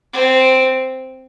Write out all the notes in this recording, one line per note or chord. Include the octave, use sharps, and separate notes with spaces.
C4